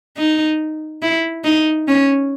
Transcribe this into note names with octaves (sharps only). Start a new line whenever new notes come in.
D#4
E4
D#4
C#4